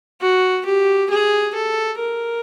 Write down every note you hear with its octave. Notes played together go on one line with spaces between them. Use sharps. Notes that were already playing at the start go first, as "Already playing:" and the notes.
F#4
G4
G#4
A4
A#4